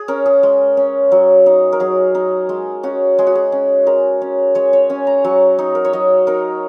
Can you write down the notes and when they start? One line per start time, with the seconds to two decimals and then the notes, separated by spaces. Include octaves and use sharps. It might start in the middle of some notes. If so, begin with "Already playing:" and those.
Already playing: G#4
0.08 C#4 A#4
0.26 G#4
0.43 G#3
0.77 C#4
1.12 F#3
1.46 D#4
1.73 A#4
1.80 F#3 G#4
2.15 D#4
2.49 G#3
2.83 C#4 F#4
3.18 G#3 G#4
3.27 F#4
3.35 G#4
3.52 C#4
3.87 G#3 A#4
4.22 C#4
4.55 G#3 C#5
4.73 C#5
4.90 C#4 G#5
5.07 A#5
5.24 F#3 C#6
5.58 D#4
5.75 A#4
5.85 C#5
5.93 F#3 D#5
6.27 D#4 A#4